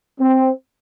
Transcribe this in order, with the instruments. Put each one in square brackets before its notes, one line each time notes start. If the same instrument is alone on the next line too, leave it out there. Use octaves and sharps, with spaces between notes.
[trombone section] C4